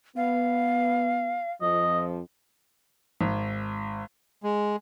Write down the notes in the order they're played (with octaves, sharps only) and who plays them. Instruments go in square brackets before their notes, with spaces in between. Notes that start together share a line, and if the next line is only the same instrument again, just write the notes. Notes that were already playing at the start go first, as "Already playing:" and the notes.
[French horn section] B3 [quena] F5
[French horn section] F2 F3 [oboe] D#5
[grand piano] G#1
[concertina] G#3